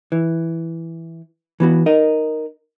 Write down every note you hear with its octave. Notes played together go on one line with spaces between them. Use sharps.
E3
E3 B3 F#4
D#4 A#4 D#5